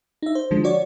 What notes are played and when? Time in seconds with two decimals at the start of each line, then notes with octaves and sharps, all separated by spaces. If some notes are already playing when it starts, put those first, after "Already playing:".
0.22 D#4 E5
0.35 C5
0.51 D3 F3 G#3
0.64 F#4 C#5 D5